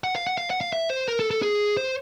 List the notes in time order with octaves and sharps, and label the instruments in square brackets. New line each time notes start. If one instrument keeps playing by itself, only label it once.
[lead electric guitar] F#5
F5
F#5
F5
F#5
F5
E5
C5
A#4
A4
A4
G#4
C5